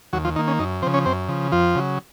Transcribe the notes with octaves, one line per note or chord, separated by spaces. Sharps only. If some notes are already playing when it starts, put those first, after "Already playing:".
D#2 F#3 F#4
F3 F4
D#3 A#3 D#4
C#4
F#2 D#4
C#3 F3 C4 C5
C#4 C#5
F#2 C4 C5
C#3 F3
F2 F3 F4
C#3 F#3